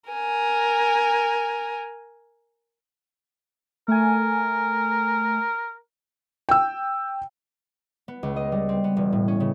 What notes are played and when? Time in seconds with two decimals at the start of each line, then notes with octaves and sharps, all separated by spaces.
0.10 A#4 G#5
3.88 A3 A#4 G#5
6.49 G5 E6
8.08 B3
8.23 C#2
8.36 D#5
8.52 G3
8.69 C4
8.84 B3
8.97 E1
9.13 A2
9.28 C#4
9.40 C#3